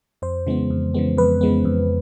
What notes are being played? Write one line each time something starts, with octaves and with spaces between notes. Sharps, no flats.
F2 C5
C#3 E3 G#3 B3
F2
C#3 E3 G#3 B3
F2 B4
C#3 E3 G#3 B3
F2